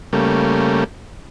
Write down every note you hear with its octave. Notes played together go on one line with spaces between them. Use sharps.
C#3 G3 A3 A#3